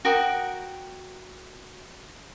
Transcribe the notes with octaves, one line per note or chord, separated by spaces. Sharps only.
F#4 A#4 G5 D#6